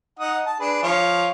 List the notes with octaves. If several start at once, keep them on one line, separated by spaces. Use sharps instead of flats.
D#4 F#5 D#6
A5
D4 G#4 B4
F3 C#5 F5